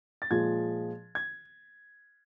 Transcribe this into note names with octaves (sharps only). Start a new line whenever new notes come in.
A6
A#2 F3 G#3 G#6
G#6